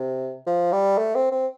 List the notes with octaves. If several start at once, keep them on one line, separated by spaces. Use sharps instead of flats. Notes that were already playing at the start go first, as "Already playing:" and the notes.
Already playing: C3
F3
G3
A3
C4
C4